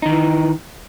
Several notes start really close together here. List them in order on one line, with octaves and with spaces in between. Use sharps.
D#4 D#3 E3